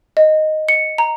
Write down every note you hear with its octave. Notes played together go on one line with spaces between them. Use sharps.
D#5
C#7
A#5